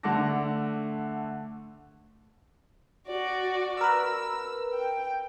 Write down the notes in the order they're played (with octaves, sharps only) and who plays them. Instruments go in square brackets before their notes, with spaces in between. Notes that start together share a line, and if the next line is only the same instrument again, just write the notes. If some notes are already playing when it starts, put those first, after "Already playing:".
[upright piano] D3 A3 F#5 A5 D6 A#6
[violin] F#4 D5
[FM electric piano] A#4 B4 [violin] E6
[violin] G5